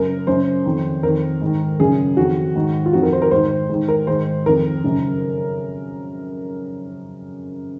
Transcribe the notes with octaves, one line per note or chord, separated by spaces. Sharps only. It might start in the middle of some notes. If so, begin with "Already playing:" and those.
Already playing: F#2 C#3 A#4
F#2 C#3 C5
F2 D#3
F2 D#3 A#4
G#2 D#3
F#2 C#3 G#4
F2 D#3 F#4
G#2 D#3
F4
F2 D#3 F#4
A#4
C5
A#4
G#2 D#3 C5
G#2 D#3
A#4
G#2 D#3 C5
F2 D#3 A#4
F#2 C#3